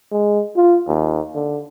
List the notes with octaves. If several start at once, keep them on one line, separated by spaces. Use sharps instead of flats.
G#3
F4
D#2
D3